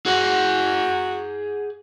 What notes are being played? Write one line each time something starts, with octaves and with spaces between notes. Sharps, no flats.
F#4 G#4 F#5